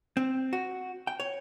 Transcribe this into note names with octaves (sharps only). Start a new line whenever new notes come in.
C4
F#4
G5
C#5